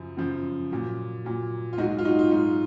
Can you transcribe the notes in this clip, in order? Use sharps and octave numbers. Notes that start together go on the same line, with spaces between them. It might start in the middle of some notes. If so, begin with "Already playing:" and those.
Already playing: F#2 C#3 F3
F#2 C#3 F3
A#2 F#3
A#2 F#3
F4
G#2 F#3 D#4 F#4
F4
D#4 F#4
F4
G#2 F#3 D#4